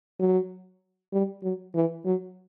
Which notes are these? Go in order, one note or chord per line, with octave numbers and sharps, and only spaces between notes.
F#3
G3
F#3
E3
F#3